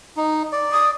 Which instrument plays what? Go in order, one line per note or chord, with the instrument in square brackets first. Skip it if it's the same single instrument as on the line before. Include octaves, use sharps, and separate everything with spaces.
[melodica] D#4
D5
[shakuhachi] D#6